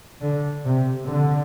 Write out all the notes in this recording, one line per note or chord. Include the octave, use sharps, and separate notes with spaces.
D3
C3
D3